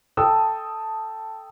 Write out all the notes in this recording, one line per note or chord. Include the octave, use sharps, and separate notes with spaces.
A4 G5 A5 D#6 E6